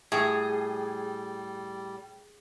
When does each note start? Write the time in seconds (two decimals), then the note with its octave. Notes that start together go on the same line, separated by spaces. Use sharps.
0.12 A2 G3 G#4